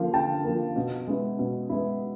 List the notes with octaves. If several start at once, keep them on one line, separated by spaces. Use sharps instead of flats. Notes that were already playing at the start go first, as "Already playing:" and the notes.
Already playing: D3 F3 A#3 F5
D3 G5 A5
F3 A#3
B2
G#3 B3 E4
B2
G#3 B3 E4